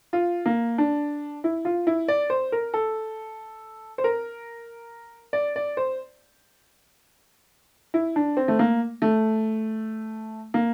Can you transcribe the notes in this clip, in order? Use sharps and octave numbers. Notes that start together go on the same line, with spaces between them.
F4
A#3
D4
E4
F4
E4
D5
C5
A#4
A4
C5
A#4
D5
D5
C5
E4
D4
C4
A3
A#3
A3
A#3